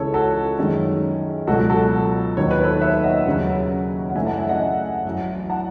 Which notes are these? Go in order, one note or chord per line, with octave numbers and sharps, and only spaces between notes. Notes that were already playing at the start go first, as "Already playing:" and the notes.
Already playing: C#2 C#3 E3 G#3 A4 C#5
F#4 A4
F#2 D#3 G#3 C#4
C#2 B2 F#3 F#4 A4
F#4 A4
D#2 D#3 F#3 C#5
B4
A4 C#5
C#5 E5
D#5 F#5
D#2 C#3 F#3 C#4
F#5
F#2 C#3 E3 A3 C#4 E5 G#5
F#5 A5
E5 G#5
D#5 F#5
A1 A2 F#3
F#5 A5